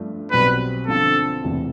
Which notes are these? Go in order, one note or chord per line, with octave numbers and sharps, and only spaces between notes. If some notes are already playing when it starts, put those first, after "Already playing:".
Already playing: G2 F3 A3 D4 F4
B1 B2 G3 C4 B4
G2 D3 F3 C4 F4 A4
E1 E2 C3 E3 A3